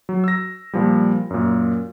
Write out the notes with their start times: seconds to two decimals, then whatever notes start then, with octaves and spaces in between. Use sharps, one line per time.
0.09 F#3
0.24 E6 A#6
0.73 A#2 F3 G3
1.30 F#2 A#2